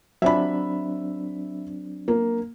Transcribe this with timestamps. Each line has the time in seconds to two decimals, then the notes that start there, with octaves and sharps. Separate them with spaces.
0.22 F#3 C4 D4 E5 B5
2.08 A#3